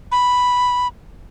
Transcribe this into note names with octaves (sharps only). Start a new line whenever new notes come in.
B5